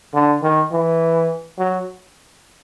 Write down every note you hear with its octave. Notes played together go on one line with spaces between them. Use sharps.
D3
D#3
E3
F#3